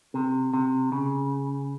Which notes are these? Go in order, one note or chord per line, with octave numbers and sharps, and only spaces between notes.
C3
C3
C#3